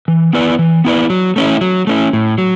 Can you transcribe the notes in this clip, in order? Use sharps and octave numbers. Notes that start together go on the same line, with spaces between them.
E3
B3 E4 B4 D5
E3
B3 E4 B4 D5
F#3
A3 C#4 E4
F#3
A3 C#4 E4
A2
F#3